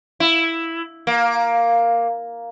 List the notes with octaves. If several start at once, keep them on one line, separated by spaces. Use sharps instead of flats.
E4
A#3